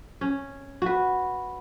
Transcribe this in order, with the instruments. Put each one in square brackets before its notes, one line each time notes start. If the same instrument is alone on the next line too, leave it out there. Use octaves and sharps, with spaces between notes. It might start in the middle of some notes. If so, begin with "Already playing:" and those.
[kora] C#4
F#4 B4